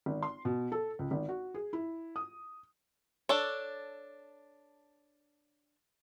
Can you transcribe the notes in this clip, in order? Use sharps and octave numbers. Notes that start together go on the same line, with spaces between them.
G#1
C6
B2
A4
C#2
G#1
F#4
G#4
E4
D#6
D4 A4 C#5